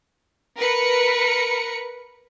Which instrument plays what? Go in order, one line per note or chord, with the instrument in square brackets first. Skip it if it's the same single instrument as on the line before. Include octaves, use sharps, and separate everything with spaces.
[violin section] A#4 B4 C#7